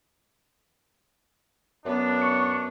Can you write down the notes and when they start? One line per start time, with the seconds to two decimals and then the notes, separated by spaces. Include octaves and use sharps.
1.85 F#2 B3 D4
2.22 C#6